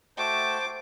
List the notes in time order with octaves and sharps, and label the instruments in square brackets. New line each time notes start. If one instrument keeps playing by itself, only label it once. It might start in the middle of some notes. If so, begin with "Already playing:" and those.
[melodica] A3 F#4 G5 [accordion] C5 A5 [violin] D6